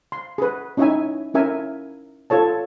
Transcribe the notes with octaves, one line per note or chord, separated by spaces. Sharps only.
C6
G#4 B4
C#4 D#4 E4 C#5 E5 G#5
C#4 E4 A#4 E5 G#5
F4 A4 C#5 A5